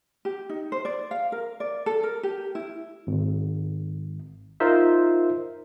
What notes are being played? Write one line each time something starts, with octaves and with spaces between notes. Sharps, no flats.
G4
D#4
C5
D5
F5
A#4
D5
A4
A#4
G4
E4
G#1
D#4 F4 A#4 C5 E5